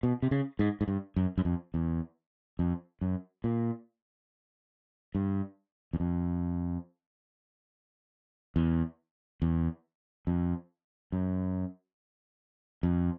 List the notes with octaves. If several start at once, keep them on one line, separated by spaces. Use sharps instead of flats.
B2
C3
C#3
G#2
G#2
G2
F#2
F#2
F2
E2
F2
F#2
A#2
G2
E2
F2
E2
E2
F2
F#2
F2